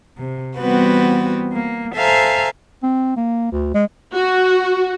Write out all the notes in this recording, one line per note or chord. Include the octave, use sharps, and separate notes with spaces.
C3
E3 G3 B3 C4 F#4 B4
A#3
A4 C5 E5 F5 G#5 A#5
C4
A#3
D2
G#3
F#4